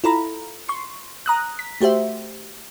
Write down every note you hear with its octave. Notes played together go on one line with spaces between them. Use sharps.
E4 F4 A4 A#5 B5
C6 C#6
A#5 D#6 F#6
B6
A3 F#4 G4 C5 E5